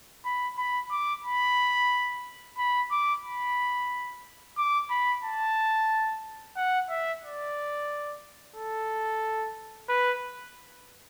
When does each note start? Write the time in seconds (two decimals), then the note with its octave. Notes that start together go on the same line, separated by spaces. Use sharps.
0.25 B5
0.58 B5
0.91 D6
1.24 B5
2.58 B5
2.91 D6
3.24 B5
4.58 D6
4.90 B5
5.24 A5
6.56 F#5
6.89 E5
7.23 D5
8.56 A4
9.89 B4